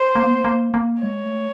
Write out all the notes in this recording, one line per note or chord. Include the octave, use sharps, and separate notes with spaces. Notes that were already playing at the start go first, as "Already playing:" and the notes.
Already playing: C5
A#3
B3
A#3
A#3
A#3
G#3 C#5
A3